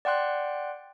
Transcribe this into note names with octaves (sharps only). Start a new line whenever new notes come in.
D5 F#5 G5 C6 F#6